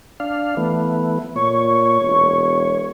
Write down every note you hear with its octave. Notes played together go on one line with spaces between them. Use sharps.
D4 F5
E3 A3 B3
A#2 C#5 C#6
E1